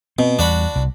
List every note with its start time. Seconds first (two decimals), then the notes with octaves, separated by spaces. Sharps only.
0.19 B2 C4
0.39 E2 G3 D4 F#4 B5
0.75 C2